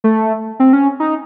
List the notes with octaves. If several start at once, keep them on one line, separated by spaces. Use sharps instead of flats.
A3
C4
C#4
D#4